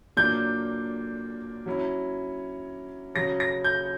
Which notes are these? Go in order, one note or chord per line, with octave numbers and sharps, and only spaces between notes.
A#2 F#3 A#3 D4 G6
F#3 C#4 E4
C#3 F#3 C#4 A#6
A#6
G6